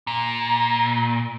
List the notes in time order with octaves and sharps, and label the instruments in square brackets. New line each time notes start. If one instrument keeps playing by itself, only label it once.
[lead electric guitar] A#2